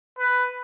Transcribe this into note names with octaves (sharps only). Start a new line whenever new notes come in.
B4